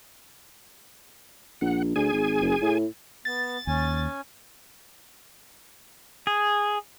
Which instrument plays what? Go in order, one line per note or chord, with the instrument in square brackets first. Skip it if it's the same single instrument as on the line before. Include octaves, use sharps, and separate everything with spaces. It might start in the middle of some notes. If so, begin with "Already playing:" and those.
[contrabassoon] A#1 [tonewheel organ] F#5
[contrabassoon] D2 [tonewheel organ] G#4 G#5
[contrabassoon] G#1
F#1
A2
[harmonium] B3 [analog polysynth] A6
[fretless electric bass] D#2 [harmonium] C#4 G#5
[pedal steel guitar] G#4